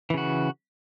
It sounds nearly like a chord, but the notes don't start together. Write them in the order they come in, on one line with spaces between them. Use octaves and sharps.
E3 C#3 F#4